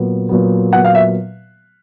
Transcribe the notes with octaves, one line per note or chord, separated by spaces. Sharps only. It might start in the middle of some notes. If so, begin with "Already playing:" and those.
Already playing: A#2 F#3 B3
A#2 F#3 B3
A#2 F#3 B3 F#5
F5
E5